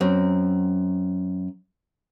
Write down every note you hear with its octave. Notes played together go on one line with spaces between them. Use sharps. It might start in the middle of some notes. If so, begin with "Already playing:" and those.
F#2 C4